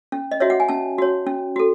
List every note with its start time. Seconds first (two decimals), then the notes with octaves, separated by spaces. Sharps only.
0.12 C#4
0.31 D#5
0.40 F#4 C#5 E5
0.50 F#5
0.60 G#5
0.69 C#4 A5
0.98 F#4 C#5
1.27 C#4
1.56 F#4 A4